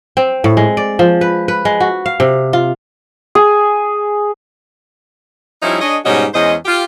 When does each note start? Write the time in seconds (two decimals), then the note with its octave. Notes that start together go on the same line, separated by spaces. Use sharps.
0.17 C4
0.44 A2
0.57 G#3
0.77 D5
0.99 F3
1.21 B4
1.48 B4
1.65 G#3
1.80 F#4
2.06 F5
2.20 C3
2.53 F4
3.35 G#4
5.63 F3 G3 C#4 D#4 E4
5.81 D4 G#4 C#5 D#5
6.05 G#2 B2 G3 C#4 F#4 D#5
6.34 E2 G#3 C#4 C5 D#5
6.66 F4 G4